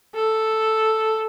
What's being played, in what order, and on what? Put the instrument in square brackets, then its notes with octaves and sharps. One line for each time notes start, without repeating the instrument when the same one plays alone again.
[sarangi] A4